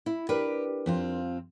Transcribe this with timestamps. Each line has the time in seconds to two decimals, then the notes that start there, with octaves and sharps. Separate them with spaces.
0.06 E4
0.29 D4 G4 A#4 B4
0.86 F2 C4 F4